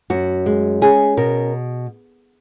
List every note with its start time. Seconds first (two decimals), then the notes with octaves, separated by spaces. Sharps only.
0.10 F#2 F#4
0.46 G#3
0.81 C#4 G#4
1.17 B2 A#4